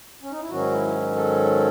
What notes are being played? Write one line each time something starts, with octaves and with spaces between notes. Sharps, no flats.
C#4
D#4
E4
G#2 D#3 F#3 C#4 F#4
E4
A4